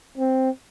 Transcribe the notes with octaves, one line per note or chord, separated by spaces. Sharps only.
C4